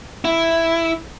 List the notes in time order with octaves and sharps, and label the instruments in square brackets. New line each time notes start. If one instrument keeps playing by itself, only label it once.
[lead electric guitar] E4